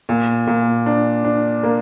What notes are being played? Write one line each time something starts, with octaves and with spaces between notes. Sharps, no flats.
A#2
A#2
D4
D4
A#3